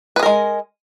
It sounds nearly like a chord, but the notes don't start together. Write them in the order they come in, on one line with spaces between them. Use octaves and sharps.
B4 G#4 A#4 G#3